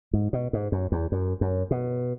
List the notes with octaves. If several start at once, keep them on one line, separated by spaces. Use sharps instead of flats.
G#2
B2
G#2
F#2
E2
F#2
F#2
B2